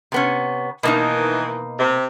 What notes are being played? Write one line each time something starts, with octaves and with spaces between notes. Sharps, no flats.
C3 B3 C#4
B2 D#3 E3 A#3 D#4
C3